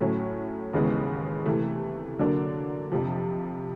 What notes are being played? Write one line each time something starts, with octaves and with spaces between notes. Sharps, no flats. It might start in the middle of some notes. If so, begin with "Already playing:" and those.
A2 F#3 A3 C#4
D#2 C#3 E3 G#3 B3
C3 E3 A3
D3 F#3 A#3 D4
F2 C3 F3